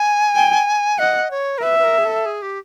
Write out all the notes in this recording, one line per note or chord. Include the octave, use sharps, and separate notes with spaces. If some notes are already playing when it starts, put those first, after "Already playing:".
Already playing: G#5
G5
D#5 F#5
C#5
A#4
B4 E5
B4
A#4
G#4
A4
G#4
G4